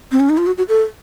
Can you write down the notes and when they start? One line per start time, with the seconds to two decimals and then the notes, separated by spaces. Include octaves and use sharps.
0.12 C4
0.20 C#4
0.29 D#4
0.38 F4
0.47 F#4
0.58 F#4
0.69 A4